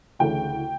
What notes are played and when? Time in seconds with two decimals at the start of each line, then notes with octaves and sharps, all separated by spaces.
0.19 D2 C#3 E3 A3 G5